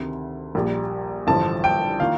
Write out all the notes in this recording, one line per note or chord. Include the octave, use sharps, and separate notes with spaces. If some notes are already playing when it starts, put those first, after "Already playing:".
Already playing: D2 C3 D#3
A#1 A#2 G3
A1 G2 D3 F3 A5
G5
D#3 A#3 F4 F5